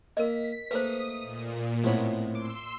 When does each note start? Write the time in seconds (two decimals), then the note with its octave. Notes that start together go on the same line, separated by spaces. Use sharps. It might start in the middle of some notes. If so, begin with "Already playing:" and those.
0.17 A#3 A#4 D#5 B6
0.71 A3 A#3 D#4 B4 C5 D#6
1.21 A#2
1.84 A2 G#3 B3 C4 C#5 B5
2.35 C6 D6 E6